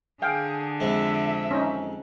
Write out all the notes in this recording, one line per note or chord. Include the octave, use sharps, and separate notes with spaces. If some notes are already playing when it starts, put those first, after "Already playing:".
D3 G#4 F5 G5
F2 C3 G#3 E5
C#4 D#4